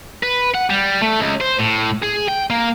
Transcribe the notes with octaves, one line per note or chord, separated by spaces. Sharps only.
B4
F#5
G3
A3
C#2
C5
A2
G#4
G5
A#3